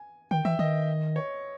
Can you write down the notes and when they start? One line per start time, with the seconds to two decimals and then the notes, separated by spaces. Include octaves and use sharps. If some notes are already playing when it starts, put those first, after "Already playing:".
Already playing: G#5
0.31 D#3 G5
0.45 E3 E5
0.59 D#3 D#5
1.16 C#5